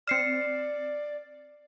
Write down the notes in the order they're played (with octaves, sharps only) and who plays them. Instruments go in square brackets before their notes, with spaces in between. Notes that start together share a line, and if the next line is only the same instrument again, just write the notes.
[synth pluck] C4 E7 [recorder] D5 [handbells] F6 C7 C#7